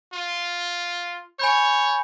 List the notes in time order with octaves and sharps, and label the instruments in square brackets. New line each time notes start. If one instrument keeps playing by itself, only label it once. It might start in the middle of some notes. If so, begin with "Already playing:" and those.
[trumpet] F4
[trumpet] C#5 [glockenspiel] G#5 B5 G6